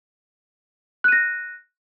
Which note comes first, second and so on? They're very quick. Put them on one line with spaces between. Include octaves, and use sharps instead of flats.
F#6 D#7 A#6